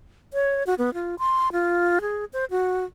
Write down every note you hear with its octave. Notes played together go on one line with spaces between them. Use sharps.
C#5
F#4
B3
F4
C6
F4
G#4
C5
F#4